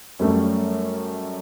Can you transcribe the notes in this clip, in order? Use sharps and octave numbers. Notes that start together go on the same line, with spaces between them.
F#2 G3 A3 C#4